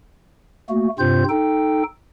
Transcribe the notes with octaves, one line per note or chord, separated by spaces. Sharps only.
A3 A#3 F#4
G2 C3 C4 F4 C5 G6
D#4 A4 G5